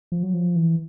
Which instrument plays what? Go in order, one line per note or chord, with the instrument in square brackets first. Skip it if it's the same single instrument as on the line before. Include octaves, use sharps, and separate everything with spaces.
[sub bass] F3
F#3
F3
E3